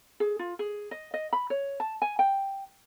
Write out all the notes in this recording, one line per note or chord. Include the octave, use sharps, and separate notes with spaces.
G#4
F4
G#4
D#5
D#5
B5
C#5
A5
G#5
G5